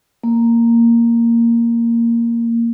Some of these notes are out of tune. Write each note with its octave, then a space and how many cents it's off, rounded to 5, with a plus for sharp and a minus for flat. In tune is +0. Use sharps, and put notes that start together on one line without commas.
A#3 -5